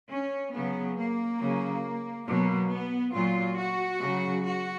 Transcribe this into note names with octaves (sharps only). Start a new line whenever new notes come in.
C#4
C#3 F#3 B3
A#3
C#3 F#3
B2 F#3 A#3
B3
A#2 F#3 F4
F#4
C#3 F#3
F#4